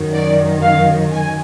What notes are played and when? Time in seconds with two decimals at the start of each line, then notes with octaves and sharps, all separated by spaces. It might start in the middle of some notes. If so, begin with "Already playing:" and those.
Already playing: F#2 D#3 F#3
0.13 D5
0.63 F5
1.12 G#5